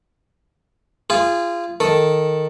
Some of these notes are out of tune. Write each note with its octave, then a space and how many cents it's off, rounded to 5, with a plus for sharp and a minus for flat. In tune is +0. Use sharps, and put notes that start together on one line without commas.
F4 -25 G#4 -20
D#3 +0 A4 +0